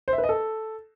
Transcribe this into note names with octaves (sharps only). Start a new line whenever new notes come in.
C5
E5
B4
D#5
A4